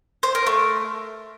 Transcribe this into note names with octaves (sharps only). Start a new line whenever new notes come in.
C5
A#4
A3